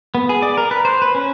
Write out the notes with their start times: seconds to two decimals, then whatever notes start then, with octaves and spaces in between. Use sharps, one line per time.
0.15 B3
0.29 G#4
0.42 D5
0.57 A#4
0.71 B4
0.85 C5
1.02 B4
1.15 C#4